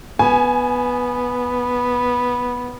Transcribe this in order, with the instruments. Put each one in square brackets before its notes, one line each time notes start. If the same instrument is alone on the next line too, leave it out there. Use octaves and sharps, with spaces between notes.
[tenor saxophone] B3 [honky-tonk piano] G#5